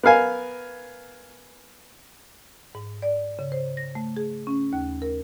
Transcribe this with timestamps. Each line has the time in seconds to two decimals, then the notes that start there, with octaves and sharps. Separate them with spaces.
0.03 B3 A#4 F5 G#5
2.75 G#2
3.02 D5
3.39 C#3
3.52 C5
3.77 A#6
3.95 A3
4.17 G#4
4.47 C#4
4.73 D#2
5.02 A#4